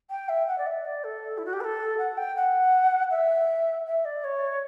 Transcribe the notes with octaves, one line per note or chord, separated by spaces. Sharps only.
G5
E5
F#5
D5
E5
D5
A4
E4
F#4
G4
B4
A4
F#5
G5
F#5
E5
E5
D5
C#5